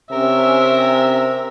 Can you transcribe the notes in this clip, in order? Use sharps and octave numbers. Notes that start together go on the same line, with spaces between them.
C3 C#4 A#4 E5